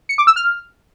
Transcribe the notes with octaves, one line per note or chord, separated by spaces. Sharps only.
C#7
D6
E6
F6